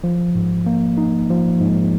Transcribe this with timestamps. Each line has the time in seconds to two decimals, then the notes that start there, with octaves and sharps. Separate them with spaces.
0.04 F3
0.35 G#2
0.66 A#3
0.98 D#4
1.30 F3
1.61 G#2